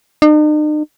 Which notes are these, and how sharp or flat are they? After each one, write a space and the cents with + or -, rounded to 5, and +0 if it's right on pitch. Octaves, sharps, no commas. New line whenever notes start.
D#4 -45